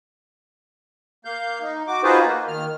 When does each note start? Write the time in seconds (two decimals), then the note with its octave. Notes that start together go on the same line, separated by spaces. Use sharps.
1.25 A#3 F5 G6
1.62 D#4
1.87 F#4 D6
2.03 D#4 F4 F#4 G#4 B4 C5
2.26 A#3
2.48 D#3 F6